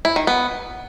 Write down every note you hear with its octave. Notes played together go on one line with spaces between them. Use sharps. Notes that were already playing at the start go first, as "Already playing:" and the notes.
E4
D#3
B3